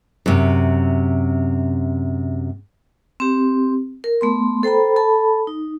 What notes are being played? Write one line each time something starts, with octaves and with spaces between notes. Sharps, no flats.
F#2 C3
C4 G4
A#4
A3 B3 C6
A4 C5 G5 A#5 B5
A4 A5 B5
D#4